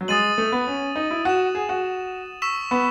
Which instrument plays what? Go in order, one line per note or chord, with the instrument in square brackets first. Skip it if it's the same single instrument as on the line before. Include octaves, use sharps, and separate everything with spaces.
[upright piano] F#3
[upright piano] G#3 [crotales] D#6 A6 D#7 F#7
[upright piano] A3
B3
C#4
D#4
E4
[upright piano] F#4 [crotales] D#6 A6 E7
[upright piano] G#4
F#4
[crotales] C#6 E6 B6 E7
[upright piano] B3